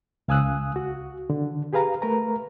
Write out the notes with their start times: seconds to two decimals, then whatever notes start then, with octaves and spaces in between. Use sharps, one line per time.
0.28 C#2 F5 G#5 D#6 E6 F#6
0.76 F#4
1.30 D3
1.73 G4 G#4 B4 F5 A#5
2.02 A3 A#4 B4 A#5